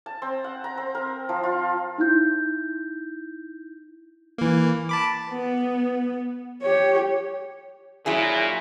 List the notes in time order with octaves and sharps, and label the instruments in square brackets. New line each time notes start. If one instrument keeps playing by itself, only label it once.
[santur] A5
C4
F#5
A#5
C4
A#4
F3
F4
[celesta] D#4 E4 G6
[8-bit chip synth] E3 A#3
A5 B5 D6
[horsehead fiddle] B3
G4 C#5
[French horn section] A#2 [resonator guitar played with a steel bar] F#3 E4 G#4